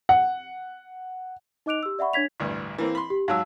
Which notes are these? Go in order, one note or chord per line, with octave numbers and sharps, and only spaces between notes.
F#5
D#4 D#5 D6 F#6 D7 F7
G4 E6
D5 E5 F#5 B5 C#6
D4 C#5 G#6 B6 F7
A1 D2 G2
E3 A#3 C4
B5 C6
G4
G#2 F#3 F5 A5 E6